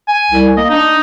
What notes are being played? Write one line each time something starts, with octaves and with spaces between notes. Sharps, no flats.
G#5
C2
A#3 D#5
D4 D#4